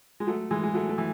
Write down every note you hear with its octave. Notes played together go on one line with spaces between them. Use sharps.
G#3
F#3 A3
E3 G#3
G#3
F#3 A3
A3
E3